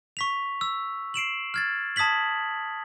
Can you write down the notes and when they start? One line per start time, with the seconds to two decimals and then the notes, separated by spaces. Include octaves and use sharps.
0.17 C#6 B6 F7
0.61 E6
1.14 C7 D7 E7 F#7
1.54 F6 G#6 A6
1.96 A5 D#6 G#6 B6 F#7